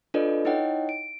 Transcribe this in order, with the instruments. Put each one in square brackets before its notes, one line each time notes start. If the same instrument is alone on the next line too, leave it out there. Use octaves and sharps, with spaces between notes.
[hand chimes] D4 F4 A4 B4 D5 D#5
D#4 E4 C#5 D#5 F#5 G5
D7